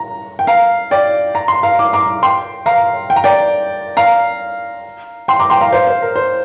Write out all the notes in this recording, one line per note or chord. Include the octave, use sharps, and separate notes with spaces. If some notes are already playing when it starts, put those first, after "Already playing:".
Already playing: A#5
G5
F5 A#5
D5 G5
A#5
C6
F5 A#5
D6
A#5 D6
G5 C6
F5 A#5
G5
A#5
D5 G5
F5 A#5
G5 C6
A#5 D6
G5 C6
F5 A#5
C5 F5
C5
A#4
C5